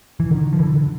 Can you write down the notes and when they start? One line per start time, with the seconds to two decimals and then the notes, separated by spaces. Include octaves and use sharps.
0.20 E3
0.31 D3 D#3
0.53 F3
0.59 D3 E3
0.74 D3